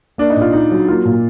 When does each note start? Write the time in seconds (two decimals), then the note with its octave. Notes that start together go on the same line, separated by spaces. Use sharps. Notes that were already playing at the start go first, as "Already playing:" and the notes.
0.18 A#3 D4
0.30 D#4
0.37 A#2 F4
0.53 D#4
0.72 F#3
0.88 A#3 F4
1.05 A#2